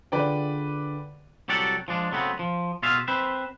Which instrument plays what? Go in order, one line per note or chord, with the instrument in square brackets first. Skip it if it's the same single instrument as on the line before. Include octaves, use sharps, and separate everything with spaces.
[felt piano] D3 F4 G#4 [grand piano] B4 D5 G5
[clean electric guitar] C2 F#3 G4 A4 D5 F#5
F3 G#3 D4
C#3 F#3 A3 B3 C4
F3
B2 F4 F#4 G#4 E5 F5
C4 B4 C5 E5